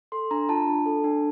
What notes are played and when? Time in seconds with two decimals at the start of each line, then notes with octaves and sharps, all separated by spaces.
0.12 A4 C6
0.31 D4 A#5
0.49 F4 A5
0.67 D4
0.86 A4
1.04 D4